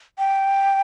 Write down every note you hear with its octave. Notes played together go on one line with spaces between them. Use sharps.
G5